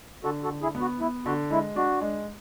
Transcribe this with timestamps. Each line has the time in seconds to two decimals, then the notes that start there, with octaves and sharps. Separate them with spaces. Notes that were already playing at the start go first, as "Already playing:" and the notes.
0.24 D3 F#4 A4
0.43 F#4 A4
0.50 D3
0.62 E4 G#4
0.75 B3
0.81 F#4
1.00 B3 E4
1.26 D3 F#4
1.50 G#3 E4
1.76 D4 F#4
2.01 G#3